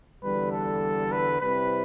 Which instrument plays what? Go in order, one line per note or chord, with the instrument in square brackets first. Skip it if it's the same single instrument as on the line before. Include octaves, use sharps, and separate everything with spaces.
[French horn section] E2 D3 G3 [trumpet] B4
[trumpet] A4
B4
[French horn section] C3 G3 C4 E4 [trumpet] B4